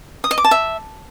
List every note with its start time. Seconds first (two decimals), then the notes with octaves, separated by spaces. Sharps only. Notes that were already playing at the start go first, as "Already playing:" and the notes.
0.24 D#6
0.31 D#5
0.38 D6
0.44 A5
0.51 E5